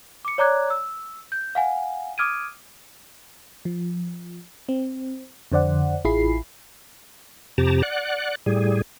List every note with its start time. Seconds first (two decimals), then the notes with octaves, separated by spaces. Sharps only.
0.25 D6 C#7
0.38 C#5 D5 A#5 D6 F#6 G#6
0.70 E6
1.32 G6
1.55 F5 F#5 G#5
2.18 D6 D#6 F6 G#6 D7 D#7
3.65 F3
4.69 C4
5.52 F2 D3 C5 D5 F#5
6.05 A1 E4 F4 G#4 B5 C7
7.58 F2 C3 G4 A5 A#5
7.83 D5 F#5 F#6
8.46 A2 G3 G#4